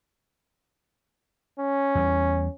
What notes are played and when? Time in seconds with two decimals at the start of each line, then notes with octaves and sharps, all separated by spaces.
1.58 C#4
1.95 E2 G3